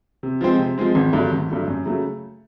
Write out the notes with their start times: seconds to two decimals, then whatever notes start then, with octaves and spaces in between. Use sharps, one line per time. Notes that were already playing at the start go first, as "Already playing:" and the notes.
0.23 C3
0.41 F3 G#3 C4
0.59 C3
0.78 F3 G#3 C4
0.95 G#1
1.13 G2 D3 F#3 A3
1.32 G#1
1.50 G2 D3 F#3 A3
1.68 F#2
1.86 C#3 F#3 A3